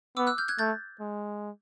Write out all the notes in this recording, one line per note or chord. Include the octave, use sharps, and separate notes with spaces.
B3 D6 E6
E6 F#6
F6 G6
F#6 G#6
A3 G6 A6
G#3